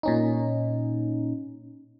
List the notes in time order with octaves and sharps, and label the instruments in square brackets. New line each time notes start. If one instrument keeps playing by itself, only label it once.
[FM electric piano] A#2 C#4 D#4